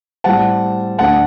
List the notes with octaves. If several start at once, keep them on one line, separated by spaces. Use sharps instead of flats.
A2 G3 C4 F#5 A5
D2 D3 A3 D4 F#5 A5